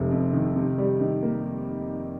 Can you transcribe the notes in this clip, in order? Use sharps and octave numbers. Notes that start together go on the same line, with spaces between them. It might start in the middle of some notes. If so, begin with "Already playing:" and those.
Already playing: F1 C3 G#3
F2
D#3
C3
G3
D#3
A#3